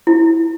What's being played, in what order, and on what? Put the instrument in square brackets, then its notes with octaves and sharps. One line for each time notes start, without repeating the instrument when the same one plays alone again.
[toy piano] E4